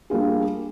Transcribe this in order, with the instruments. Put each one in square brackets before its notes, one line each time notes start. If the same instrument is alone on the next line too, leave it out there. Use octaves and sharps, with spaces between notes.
[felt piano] G3 A#3 D4 F4 G#4